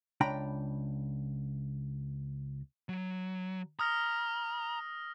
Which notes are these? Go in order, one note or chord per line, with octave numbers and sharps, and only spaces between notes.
C#2 D4 G5 A#5 B5
F#3
A#5 D#6 F6 A#6